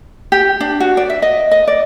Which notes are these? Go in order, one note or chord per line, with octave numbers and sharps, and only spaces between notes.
G4
D4
F#4
D5
E5
D#5
D#5
D5